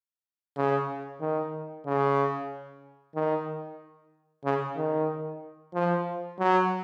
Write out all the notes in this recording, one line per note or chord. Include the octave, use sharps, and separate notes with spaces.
C#3
D#3
C#3
D#3
C#3
D#3
F3
F#3